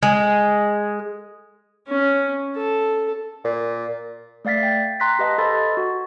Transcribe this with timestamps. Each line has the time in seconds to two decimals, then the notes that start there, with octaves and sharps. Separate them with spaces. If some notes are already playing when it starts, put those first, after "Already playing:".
0.03 G#3
1.88 C#4
2.57 A4
3.45 A#2
4.45 A3 D5 F5 A6 B6
4.63 G5
5.00 G5 A#5 C6 F#6 A#6 B6
5.19 G4 B4 D#5 F5 A5
5.38 A4 C5 D#5 B5 C6 A6
5.77 F#4